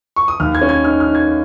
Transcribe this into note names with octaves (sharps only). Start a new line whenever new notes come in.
C#6
D#6
D#2 F6
G#6
C#4
G#6
D#3 F6
F6
D#3
G#6